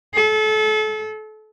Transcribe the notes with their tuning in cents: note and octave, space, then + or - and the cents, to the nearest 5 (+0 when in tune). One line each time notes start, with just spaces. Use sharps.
A4 -35